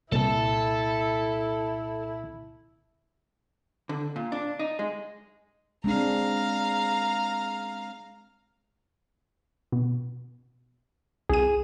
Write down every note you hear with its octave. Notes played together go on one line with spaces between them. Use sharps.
C2 A#2 E4 A4 A5
D3
A#2
D4
D#4
G#3
G#3 C4 D4 F5 A#5
B2
C2 G#4 D#7